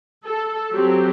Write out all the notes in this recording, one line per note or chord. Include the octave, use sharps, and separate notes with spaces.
A4
F#3 C4 G4